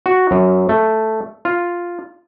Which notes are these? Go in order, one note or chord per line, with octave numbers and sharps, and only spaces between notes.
F#4
F#2
A3
F4